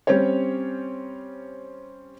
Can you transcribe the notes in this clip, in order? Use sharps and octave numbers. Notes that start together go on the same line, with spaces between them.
G3 C4 C#4 C5 C#5